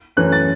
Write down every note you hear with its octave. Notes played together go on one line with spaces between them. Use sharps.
F#2 E3 A3 C#4 F#6
A6